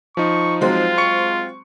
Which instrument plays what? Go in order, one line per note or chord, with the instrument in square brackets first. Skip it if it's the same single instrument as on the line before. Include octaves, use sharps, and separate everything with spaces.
[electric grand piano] F3 D#4 [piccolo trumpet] C#6
[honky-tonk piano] F#3 G#3 C4 [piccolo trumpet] F4
[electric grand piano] C#6 C#7